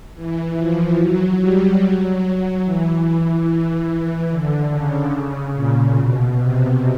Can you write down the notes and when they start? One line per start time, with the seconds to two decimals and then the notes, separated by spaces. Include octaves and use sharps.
0.15 E3
0.57 F3
0.98 F#3
1.40 G3
1.81 F#3
2.64 E3
3.47 E3
3.88 E3
4.30 D3
4.71 C#3
5.54 A#2
5.95 B2
6.37 C3